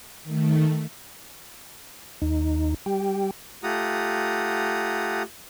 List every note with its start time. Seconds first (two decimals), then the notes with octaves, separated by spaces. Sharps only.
0.24 D#3 A3
2.22 D#2 D#4
2.86 G3 G4 G5
3.64 A3 F4 G4 F#5 A#5 D#6